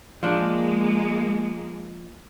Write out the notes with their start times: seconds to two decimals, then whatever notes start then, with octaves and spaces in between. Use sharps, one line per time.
0.23 F3 G#3 A#3 D4